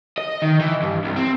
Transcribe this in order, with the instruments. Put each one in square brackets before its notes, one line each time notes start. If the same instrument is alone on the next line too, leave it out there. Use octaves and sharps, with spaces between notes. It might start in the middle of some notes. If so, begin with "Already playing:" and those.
[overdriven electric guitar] D#5
D#3
E3
G2
C2
C4